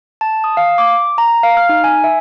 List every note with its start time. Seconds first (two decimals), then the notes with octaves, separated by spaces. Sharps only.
0.21 A5
0.44 D#6
0.57 F5
0.78 D6
1.18 A#5
1.43 F5
1.57 F6
1.69 D#4
1.84 G#5
2.04 E5